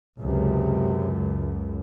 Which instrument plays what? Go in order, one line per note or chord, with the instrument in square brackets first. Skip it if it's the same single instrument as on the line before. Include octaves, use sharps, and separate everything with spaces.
[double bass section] C#2 F#2 [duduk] C3